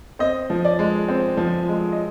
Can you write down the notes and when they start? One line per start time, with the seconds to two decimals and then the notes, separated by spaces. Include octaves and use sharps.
0.19 C4 D#5
0.50 F3
0.65 D5
0.79 G#3
1.09 C4
1.37 F3
1.68 G#3
1.92 D#5